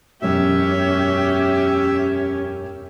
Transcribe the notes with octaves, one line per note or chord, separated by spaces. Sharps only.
E1 F#2 B2 C#4 G4 E5